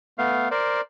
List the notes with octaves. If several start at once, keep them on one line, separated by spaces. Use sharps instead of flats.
A3 B3 F5
A#4 C5 D5